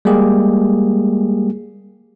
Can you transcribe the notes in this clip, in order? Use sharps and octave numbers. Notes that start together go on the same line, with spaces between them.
G3 G#3 A#3 G4 G#4